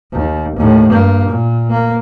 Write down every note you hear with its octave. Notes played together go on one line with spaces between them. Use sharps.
D#2
D#2 A2
G2 A#3
A#2
A#3